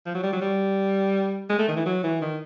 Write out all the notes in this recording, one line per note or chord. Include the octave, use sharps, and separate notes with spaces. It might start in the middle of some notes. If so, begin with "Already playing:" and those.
F3
F#3
G3
F#3
G3
G#3
A3
D#3
E3
F#3
E3
D#3